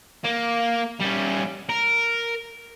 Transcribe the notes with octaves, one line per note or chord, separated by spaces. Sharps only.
A#3
G3 C#4
A#4